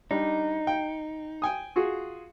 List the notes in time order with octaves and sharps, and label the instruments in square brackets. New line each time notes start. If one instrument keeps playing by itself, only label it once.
[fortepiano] G3 D4 [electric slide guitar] D#4
[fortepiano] G5
G5 G#5 D#6
F4 F#4 G#4